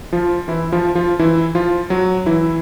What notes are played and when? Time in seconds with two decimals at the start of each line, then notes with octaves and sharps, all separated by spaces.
0.12 F3 F4
0.48 E3 E4
0.72 F3 F4
0.95 F3 F4
1.19 E3 E4
1.55 F3 F4
1.90 F#3 F#4
2.26 E3 E4